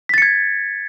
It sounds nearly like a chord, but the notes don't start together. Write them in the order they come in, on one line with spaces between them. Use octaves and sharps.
B6 A6 C#7 G#6